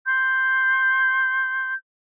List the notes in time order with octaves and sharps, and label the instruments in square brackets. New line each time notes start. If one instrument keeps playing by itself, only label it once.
[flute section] C6 G6